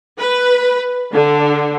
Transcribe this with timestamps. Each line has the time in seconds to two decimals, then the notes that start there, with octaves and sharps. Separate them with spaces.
0.19 B4
1.14 D3